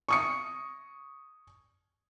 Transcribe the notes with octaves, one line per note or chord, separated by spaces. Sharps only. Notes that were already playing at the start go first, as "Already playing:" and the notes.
C#6 D#6 C#7